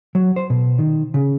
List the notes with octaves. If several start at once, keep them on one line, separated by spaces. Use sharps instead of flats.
F#3
C5
B2
D#3
C#3